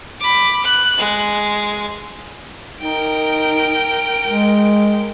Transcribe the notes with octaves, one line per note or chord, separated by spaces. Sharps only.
B5 D6
F#6
G#3
D#4 A#4 G5
G#3